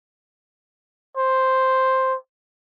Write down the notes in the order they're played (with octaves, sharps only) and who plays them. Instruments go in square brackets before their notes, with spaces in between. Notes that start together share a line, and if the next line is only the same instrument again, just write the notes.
[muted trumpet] C5